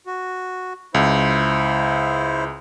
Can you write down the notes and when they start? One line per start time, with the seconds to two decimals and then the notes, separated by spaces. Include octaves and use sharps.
0.07 F#4
0.94 C#2 E4 C5